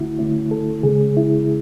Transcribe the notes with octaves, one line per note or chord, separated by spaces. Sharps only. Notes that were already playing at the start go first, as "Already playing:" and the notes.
Already playing: D3 A3 C#4 E4 F#4
D3 A3 C#4 E4
A4
C#3 G#3 C#4 G#4
E4